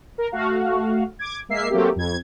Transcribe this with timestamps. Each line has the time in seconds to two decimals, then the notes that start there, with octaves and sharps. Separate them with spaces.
0.18 A#4
0.32 A3 F#4 F5
1.19 D6 G#6
1.49 G#3 A#3 E5 C7
1.70 F#3 A3 A#3 C4 G4
1.96 F2 G#6